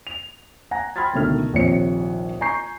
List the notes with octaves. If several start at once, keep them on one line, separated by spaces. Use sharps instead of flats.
F7
F#5 G#5 A#5 A#6
G5 B5 C6 F6 G#6 A6
C#2 B2 D3 D#3 A3 F6
D#1 A#1 D#2 C3 C#5 C#7
G#5 A#5 C#6 G6 C7